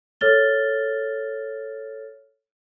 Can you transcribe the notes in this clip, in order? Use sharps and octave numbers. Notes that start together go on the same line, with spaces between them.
A4 C#5 F6 A6 G7